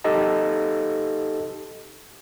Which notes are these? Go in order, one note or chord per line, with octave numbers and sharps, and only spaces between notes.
D#4 G4 A4 D#5 A5